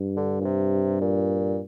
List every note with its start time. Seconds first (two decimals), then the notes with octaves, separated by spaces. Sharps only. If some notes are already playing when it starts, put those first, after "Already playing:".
Already playing: G2
0.17 D3
0.41 A#2
0.45 C3
1.01 A#2